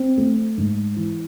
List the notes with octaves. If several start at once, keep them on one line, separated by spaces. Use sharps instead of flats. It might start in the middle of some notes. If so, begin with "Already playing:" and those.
Already playing: C4
A3
G#2
E3